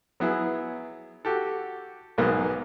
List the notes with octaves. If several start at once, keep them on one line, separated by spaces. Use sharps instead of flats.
F#3 B3 E4 G#4
F#4 G4 A4
B1 G#2 F#3 G#3 A#3 B3